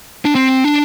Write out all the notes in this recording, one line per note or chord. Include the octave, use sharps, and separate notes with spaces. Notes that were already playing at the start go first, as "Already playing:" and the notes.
D4
C4
D4